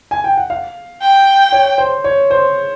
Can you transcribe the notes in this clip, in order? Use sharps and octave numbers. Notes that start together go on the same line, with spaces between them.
G#5
G5
F#5
F5
G5
C#5
C5
C#5
C5